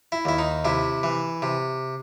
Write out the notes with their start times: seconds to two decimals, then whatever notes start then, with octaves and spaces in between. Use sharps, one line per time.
0.12 E4
0.25 D#2 E4
0.38 D#4
0.65 C3 E4
1.03 E3
1.42 C3